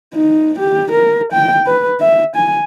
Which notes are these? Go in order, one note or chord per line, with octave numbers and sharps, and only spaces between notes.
D#4
G4
A#4
G5
B4
E5
G#5